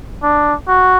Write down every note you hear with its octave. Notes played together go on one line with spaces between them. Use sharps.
D4
F#4